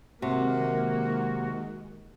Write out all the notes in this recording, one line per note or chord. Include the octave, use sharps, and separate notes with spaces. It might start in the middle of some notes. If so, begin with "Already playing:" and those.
C3 D#3 G#3 A#3 F#4